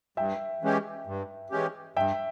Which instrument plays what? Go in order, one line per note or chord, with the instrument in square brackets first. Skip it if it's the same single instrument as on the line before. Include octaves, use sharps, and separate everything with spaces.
[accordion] G2 [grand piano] E5 G5
[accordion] E3 G#3 C#4 G4
G2
E3 G#3 C#4 G4
[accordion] G2 [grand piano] E5 G5